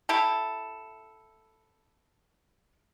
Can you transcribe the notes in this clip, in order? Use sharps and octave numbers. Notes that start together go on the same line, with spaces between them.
E4 G4 A4